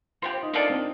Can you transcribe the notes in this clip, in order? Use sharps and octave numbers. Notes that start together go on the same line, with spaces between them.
C4 D#4 F4 G4
C5
D#4
A#3 D4 F4 A4 D5
C4